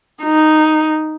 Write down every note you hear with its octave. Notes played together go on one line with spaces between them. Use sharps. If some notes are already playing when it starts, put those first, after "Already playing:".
D#4